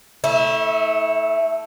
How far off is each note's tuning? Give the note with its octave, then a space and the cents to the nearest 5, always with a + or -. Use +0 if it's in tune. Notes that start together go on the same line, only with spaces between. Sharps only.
A3 +0 E4 -35